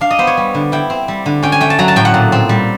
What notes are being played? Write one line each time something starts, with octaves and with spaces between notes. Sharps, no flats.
D4 F5
D#5
B3 C5
C#5
G3
D3
E4 G5
C4
G3
D3
C#4 G5
G#5
A3 G5
A5
F#3 A#5
A5
A2 G5
F#5
A#2
C4
G3